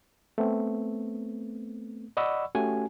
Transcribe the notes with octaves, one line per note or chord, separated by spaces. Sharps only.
A3 B3 C4
D5 D#5 F#5 B5 C#6 E6
A3 C#4 F#4 G4 G#5